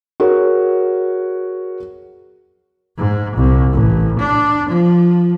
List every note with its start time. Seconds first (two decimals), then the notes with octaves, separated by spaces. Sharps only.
0.20 F#4 G#4 A#4 C#5
2.97 G#2
3.36 C2
3.73 A1
4.19 D4
4.69 F3